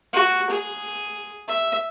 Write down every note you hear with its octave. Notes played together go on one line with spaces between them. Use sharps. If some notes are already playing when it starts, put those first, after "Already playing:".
F#4
G#4
E5